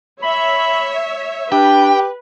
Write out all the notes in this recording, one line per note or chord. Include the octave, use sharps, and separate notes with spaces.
C#5 E5 B5
D4 G4 B4 G5